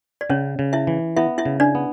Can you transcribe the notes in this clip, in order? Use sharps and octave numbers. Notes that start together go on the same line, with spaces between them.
D5
C#3 C#4 C#5
C#3
E4 E5
E3
B3 E4 E5
E4 E5
C#3
D4 D5
B3